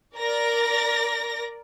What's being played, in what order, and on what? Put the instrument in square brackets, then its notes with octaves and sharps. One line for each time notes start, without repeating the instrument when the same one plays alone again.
[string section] A#4 D5 A#6